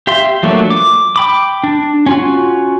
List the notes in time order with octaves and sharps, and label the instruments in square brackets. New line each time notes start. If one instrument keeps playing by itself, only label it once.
[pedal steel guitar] G4 E5 F5 C6
F3 F#3 A3 A#3 D4
D6
G5 B5 D6
D4
C#4 F4 F#4